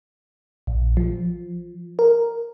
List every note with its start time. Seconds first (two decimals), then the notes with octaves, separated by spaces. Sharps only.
0.67 A#1
0.97 F3
1.99 A#4